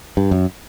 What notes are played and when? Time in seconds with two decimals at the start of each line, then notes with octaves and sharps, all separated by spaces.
0.17 G2
0.31 F#2